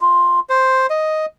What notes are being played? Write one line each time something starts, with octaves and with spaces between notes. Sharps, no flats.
F4
C5
D#5